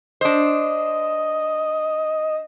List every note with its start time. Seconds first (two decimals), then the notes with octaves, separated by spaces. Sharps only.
0.21 D4 C5 D#5